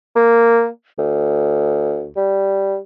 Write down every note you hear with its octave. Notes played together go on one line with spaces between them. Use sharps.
A#3
D2
G3